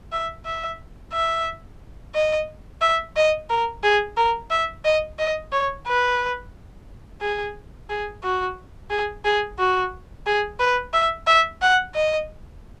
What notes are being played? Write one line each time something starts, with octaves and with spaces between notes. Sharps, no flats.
E5
E5
E5
D#5
E5
D#5
A#4
G#4
A#4
E5
D#5
D#5
C#5
B4
G#4
G#4
F#4
G#4
G#4
F#4
G#4
B4
E5
E5
F#5
D#5